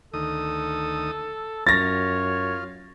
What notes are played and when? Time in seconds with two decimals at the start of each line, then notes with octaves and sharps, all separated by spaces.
0.14 D2 D#3 A4 D#6
1.67 F#2 F4 C#5 A6 A#6